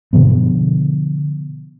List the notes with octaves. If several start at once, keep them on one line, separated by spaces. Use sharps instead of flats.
B2 D3 F3 B3